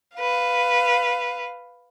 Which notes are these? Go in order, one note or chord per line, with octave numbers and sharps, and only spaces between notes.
B4 F5